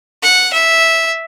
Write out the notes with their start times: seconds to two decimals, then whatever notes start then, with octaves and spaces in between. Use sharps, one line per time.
0.23 F#5
0.53 E5